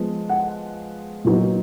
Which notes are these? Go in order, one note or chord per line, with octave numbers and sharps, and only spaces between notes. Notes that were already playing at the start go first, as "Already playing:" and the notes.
Already playing: F3 G#3 B3
F#5
A#2 F#3 B3 D#4